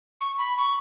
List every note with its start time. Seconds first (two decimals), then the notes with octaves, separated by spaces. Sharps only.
0.21 C#6
0.38 B5
0.57 C#6